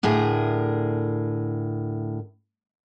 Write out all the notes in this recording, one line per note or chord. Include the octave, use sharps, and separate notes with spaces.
D2 A2 G#4 A#4